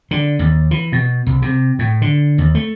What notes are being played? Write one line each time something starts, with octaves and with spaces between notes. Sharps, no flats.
D3
D#2
E3
B2
C2
C3
A2
D3
D#2
A3